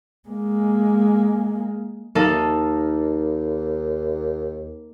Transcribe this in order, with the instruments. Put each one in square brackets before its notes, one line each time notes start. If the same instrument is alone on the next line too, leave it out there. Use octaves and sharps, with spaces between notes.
[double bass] G#3 A#3
[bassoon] D#2 [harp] A#3 D#4 A4